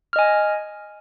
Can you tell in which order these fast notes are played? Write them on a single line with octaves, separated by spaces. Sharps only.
F6 D#5 G#5